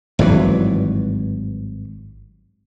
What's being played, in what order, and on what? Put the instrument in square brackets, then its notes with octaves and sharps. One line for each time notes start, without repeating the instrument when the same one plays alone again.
[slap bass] G#1 G2 E3 F#3